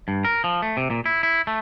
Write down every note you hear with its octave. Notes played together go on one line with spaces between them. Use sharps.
G2
A#4
F3
A3
C3
A#2
E4
E4
A3